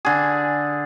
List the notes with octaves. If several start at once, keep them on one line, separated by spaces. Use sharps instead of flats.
D3 G#4